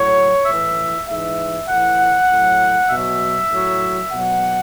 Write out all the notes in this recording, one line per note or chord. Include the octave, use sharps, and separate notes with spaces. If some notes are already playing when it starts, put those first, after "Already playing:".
Already playing: A2 F#3 C#5
A2 E3 E5
G#2 E3 E5
A2 E3 F#5
A2 F#3
B2 F#3 E5
A2 F#3
B2 F#3 F#5